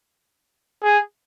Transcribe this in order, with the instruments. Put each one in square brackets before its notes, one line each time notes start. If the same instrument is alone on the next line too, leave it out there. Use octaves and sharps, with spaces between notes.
[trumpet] G#4